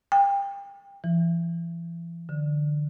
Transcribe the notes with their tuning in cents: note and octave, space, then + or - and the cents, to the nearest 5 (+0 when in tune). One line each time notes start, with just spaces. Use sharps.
G5 +30
E3 +40
D3 +20